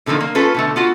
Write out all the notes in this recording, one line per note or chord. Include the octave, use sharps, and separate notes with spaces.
B2 D3 D#3 F3 A#3
A#3
C#4 F4 A4 B4
B2 D3 A3
B3 F4 F#4